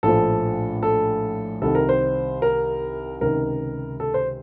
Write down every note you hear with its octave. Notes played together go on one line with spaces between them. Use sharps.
A#1 A2 F3 A4
A4
C2 C3 D#3 A4
A#4
C5
A#4
C#2 C3 D#3 A#4
A4
C5